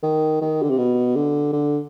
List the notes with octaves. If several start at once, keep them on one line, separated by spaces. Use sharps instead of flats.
D#3
D#3
D3
C3
B2
D3
D3